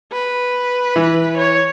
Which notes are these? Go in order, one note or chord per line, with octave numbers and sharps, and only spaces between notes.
B4
E3
C#5